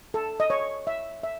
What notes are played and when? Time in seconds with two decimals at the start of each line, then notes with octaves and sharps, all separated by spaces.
0.14 A4
0.40 D#5
0.50 C#5
0.87 E5
1.23 E5